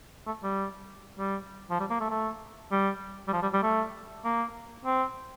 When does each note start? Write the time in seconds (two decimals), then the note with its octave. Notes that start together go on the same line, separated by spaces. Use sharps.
0.27 A3
0.43 G3
1.18 G3
1.70 F3
1.80 G3
1.90 A#3
2.00 A3
2.10 A3
2.72 G3
3.28 G3
3.33 F3
3.42 G3
3.53 G3
3.63 A3
4.25 A#3
4.85 C4